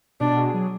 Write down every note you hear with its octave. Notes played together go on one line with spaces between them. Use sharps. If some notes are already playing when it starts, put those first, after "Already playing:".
B2 D4
G#4
F#3